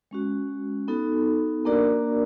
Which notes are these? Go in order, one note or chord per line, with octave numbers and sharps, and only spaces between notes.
G#3 C#4 F#4
B3 D#4 F#4 A4
A#3 D4 F#4 A#4 D5